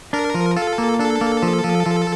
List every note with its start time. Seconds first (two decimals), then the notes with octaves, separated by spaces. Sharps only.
0.13 D4 A#4
0.34 F3
0.57 F4 A4
0.78 A#3
0.99 D4 A4
1.21 A#3
1.43 F3
1.64 F3
1.86 F3